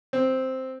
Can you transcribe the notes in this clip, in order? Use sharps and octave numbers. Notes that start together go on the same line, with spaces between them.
C4